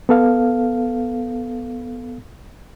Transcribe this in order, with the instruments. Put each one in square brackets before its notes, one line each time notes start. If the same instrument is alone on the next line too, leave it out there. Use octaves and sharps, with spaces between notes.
[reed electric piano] B3 A4 F5